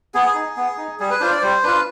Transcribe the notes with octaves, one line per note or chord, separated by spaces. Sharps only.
B3 G#4
D#4
B3
D#4
G3 G#4
B4
D4 F4 C5
D5
G3 C5
D4 F4 B4